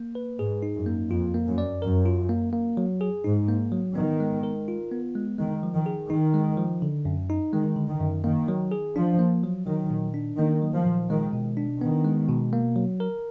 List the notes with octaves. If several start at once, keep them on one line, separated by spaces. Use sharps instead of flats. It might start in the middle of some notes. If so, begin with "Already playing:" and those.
Already playing: A#3
B4
G#2 G#4
D#4
F#2
A#3
F2 F4
A#3
F#2
D5
F#2 A#4
F4
A#3
A#3
F#3
G#4
G#2 D#4
A#3
F#3
D#3 B3
G#3
A#4
F4
B3
G#3
D#3 G#3
F3
D#3
G#4
D#3 D#4
G#3
F3
D3
F#2
D#4
D#3 G#3
D3
D#3
F#2
D#3 A#3
F#3
G#4
F3 D4
A#3
F#3
D#3 F#3
A#2
D4
D#3 A#3
F#3
F3
A#2
D#3 G#3
B2
D4
D#3 B3
G#3
B2
A#3
F#3
A#4